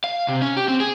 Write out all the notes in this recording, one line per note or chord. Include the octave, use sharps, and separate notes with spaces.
F5
C3
C#4
G4
C4
G#4